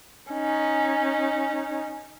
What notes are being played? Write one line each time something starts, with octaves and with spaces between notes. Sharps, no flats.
C#4 D#4